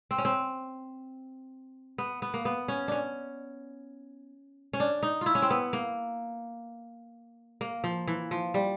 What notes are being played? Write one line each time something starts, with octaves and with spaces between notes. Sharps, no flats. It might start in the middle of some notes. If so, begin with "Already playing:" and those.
C4
C#4
C4
B3
B3
A#3
B3
C#4
C#4 D4
C#4
D4
D#4
E4 F4
C#4
C4
B3
A#3
A#3
F3
E3
F3
G3